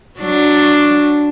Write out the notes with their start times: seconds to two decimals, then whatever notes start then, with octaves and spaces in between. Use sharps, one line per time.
0.19 F#3 D4